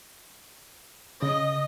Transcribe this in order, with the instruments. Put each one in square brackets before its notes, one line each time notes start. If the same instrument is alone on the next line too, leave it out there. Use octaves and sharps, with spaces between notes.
[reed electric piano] C#3 [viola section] D#5